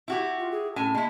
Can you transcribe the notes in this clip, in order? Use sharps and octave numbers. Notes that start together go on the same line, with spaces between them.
E4 F#4 G4
F4
G#4
A2 C#4 G#5
G#3 A#3 E4